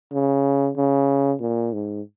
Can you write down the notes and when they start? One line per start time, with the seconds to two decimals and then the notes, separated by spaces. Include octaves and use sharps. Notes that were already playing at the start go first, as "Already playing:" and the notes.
0.12 C#3
0.77 C#3
1.41 A#2
1.73 G#2